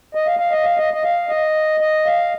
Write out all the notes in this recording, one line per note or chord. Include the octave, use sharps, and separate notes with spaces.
D#5
F5
F5
D#5
F5
D#5
D#5
F5
D#5
D#5
F5